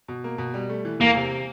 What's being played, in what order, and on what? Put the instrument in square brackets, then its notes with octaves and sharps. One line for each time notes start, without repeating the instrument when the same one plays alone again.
[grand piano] B2
A#3
B2
G3
A3
E3
[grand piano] E2 [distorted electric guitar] A#3
[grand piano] C3